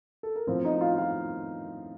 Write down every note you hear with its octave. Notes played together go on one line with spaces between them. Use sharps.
A4
A#4
A2 F3 C4 C5
D#4 D#5
F4 F5
F4 F5